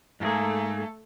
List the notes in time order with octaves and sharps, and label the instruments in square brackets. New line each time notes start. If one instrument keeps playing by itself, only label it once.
[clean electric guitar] G#2 A#3 G#4 [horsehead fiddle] A3 A4